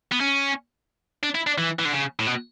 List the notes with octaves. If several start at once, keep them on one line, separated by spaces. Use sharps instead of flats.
B3
C#4
D4
E4
D4
E3
E3
D3
C#3
A2
B2